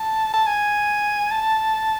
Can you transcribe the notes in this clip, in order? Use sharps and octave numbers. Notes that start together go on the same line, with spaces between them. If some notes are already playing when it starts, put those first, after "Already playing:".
Already playing: A5
A5
G#5
A5